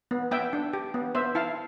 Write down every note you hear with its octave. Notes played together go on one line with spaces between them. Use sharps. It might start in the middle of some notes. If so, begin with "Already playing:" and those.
B3
B3 E5 G5
D4
G4
B3
B3 C5 E5
E4 F5 A5